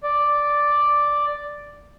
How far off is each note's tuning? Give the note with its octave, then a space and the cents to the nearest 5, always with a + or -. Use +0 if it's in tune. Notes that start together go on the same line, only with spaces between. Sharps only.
D5 +0